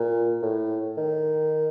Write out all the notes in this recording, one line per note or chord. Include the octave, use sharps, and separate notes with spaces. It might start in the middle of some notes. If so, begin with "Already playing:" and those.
Already playing: A#2
A2
D#3